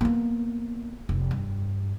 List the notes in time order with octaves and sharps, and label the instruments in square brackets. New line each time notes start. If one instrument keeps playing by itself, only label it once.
[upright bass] A#3 B3
F1
G2